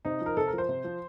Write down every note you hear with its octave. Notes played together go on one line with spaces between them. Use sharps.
C3 D#4
F3
A#4
C3 A4
A#4
F3
C5
C3
F3